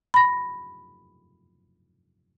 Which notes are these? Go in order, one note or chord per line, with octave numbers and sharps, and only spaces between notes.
B5 A#6